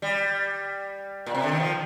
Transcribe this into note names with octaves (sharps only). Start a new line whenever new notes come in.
G3
A#2
C3
D3
D#3
F3